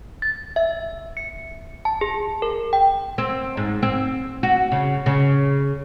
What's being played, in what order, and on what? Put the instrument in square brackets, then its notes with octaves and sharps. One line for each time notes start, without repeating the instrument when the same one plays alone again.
[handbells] A6
E5
C#7
A5
G#4
A#4
G5
[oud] C4
G#2
C4
F#4
C#3
C#3